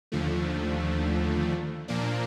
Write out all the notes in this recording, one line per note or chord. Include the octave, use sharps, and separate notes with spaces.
D#2 D3 F3 A3
A#2 F3 A#3 D4